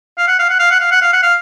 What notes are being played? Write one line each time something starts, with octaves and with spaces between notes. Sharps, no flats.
F5
F#5
F5
F#5
F5
F#5
F5
F#5
F5
F#5
F5